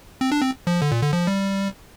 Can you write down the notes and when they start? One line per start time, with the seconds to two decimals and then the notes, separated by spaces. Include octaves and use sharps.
0.21 C4
0.32 D4
0.41 C4
0.67 F3
0.82 D3
0.92 A#2
1.02 D3
1.13 F3
1.27 G3